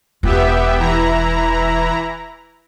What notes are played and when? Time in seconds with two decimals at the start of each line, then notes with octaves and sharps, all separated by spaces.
0.23 E1 B3 F4 G4 E5
0.79 E3 E4 A#5